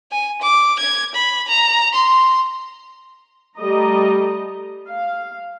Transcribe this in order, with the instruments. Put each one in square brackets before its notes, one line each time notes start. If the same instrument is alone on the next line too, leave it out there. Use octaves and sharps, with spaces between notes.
[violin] G#5
D6
G#6
B5
A#5
C6
[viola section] G3 A3 D#5 A#5
F5